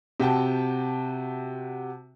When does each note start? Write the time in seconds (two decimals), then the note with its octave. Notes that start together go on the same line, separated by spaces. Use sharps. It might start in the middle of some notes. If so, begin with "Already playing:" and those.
0.20 C3 F#4 G5 A5